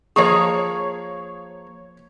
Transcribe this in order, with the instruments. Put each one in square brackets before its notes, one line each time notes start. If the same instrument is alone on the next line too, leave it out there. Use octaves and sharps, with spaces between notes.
[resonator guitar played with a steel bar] F3 A#3 G#4 [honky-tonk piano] C#5 C#6